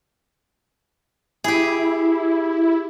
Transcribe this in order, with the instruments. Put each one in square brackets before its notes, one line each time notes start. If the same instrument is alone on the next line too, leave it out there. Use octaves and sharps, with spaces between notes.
[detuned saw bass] E4 [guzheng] G4 G#4